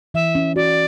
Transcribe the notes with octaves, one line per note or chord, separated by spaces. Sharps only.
E3 E5
C#4
F#4 D5